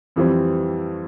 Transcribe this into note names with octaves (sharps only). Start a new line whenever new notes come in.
F2 E3 G3 C4